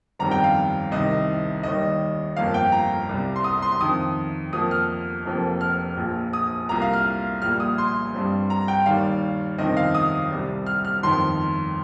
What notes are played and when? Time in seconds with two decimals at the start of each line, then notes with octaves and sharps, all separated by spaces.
0.19 G1 F2 D#3 G3 C4 A#5
0.31 G5
0.44 F5
0.91 C2 C3 D#3 D#5
1.63 D#2 D#3 G3 D#5
2.36 G1 F2 F3 A#3 F5
2.54 G5
2.72 A#5
3.09 C2 C3 G3
3.36 C6
3.44 D#6
3.62 C6
3.80 F2 D#3 C4 D#6
4.52 F2 F3 A#3 D#6
4.71 F6
5.25 F1 F2 F3 A#3
5.61 F6
5.97 A#1 A#2 F3
6.33 D#6
6.69 C2 A#2 A#3 A#5
6.82 F5
6.93 F6
7.42 A#1 A#2 G3 F6
7.60 D#6
7.78 C6
8.14 G2 G3 C4
8.50 A#5
8.68 G5
8.86 D#2 D#3 G3 F5
9.58 G1 F2 C3 D#3 C4 D#5
9.77 F5
9.95 D#6
10.31 C2 C3 G3
10.66 F6
10.85 F6
11.03 G1 F2 D#3 C6